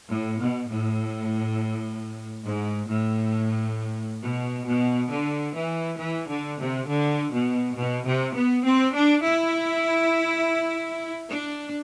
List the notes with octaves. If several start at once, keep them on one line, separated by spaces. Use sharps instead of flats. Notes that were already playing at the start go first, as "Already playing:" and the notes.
A2
B2
A2
G#2
A2
B2
B2
D3
E3
E3
D3
C3
D3
B2
B2
C3
B3
C4
D4
E4
D4